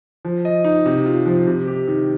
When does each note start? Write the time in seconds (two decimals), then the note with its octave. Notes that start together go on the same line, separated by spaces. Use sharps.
0.25 F3
0.45 D#5
0.64 D#4
0.86 C3
1.06 F4
1.26 F3
1.47 C3
1.67 G4
1.87 D#3